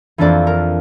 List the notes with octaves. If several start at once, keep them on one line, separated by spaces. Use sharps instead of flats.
F2 E3 A#3 D4 D5
A#4